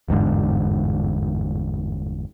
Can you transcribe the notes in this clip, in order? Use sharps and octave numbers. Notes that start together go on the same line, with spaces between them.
G1 E2 G#2 D3